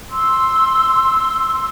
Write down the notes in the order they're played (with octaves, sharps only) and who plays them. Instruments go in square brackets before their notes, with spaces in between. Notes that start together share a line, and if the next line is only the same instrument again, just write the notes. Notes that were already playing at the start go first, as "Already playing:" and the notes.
[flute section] C6 E6